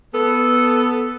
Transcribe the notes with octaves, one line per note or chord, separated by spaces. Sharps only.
B3 A4